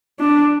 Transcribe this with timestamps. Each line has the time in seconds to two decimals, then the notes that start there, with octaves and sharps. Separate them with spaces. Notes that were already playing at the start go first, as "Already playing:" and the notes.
0.20 D4